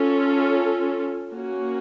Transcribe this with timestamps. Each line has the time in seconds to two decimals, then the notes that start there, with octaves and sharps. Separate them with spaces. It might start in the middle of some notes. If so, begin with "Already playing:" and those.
Already playing: C#4 F4 A4
1.31 A#3 C#4 F#4